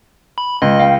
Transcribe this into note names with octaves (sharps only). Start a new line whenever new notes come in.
B5
C#2 G#3 D#5
F5 G5